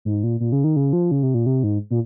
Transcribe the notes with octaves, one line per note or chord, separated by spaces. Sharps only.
G#2
A#2
A#2
C#3
D#3
C#3
F3
C#3
C3
A#2
C3
G#2
A#2